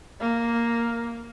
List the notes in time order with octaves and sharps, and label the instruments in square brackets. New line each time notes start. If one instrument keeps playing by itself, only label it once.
[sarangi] A#3